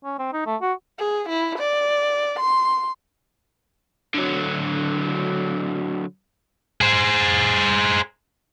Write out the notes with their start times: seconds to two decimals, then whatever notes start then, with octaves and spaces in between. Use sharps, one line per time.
0.04 C#4
0.19 C4
0.33 D#4
0.46 A3
0.61 F#4
0.99 G#4
1.29 E4
1.58 D5
2.39 C6
4.15 D3 F#3
6.81 G#4 C5